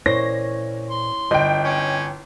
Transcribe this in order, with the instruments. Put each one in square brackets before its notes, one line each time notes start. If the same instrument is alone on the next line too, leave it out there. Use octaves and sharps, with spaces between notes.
[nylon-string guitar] A#2 C5 [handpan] E4 C#5 [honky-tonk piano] A#6
[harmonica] C6
[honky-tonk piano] G1 G5 [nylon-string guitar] D#5
[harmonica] C#4